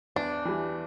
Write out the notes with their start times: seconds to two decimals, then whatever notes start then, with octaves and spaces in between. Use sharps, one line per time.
0.16 E2 D4
0.45 E3 G3